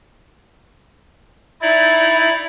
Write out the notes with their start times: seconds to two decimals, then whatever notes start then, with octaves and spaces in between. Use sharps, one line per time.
1.62 D#4 E4 D5 E5